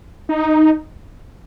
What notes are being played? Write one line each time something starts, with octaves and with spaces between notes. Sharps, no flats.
D#4